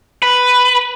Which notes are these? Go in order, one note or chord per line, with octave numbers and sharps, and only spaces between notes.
B4